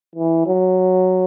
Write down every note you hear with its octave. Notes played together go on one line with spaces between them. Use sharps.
E3
F#3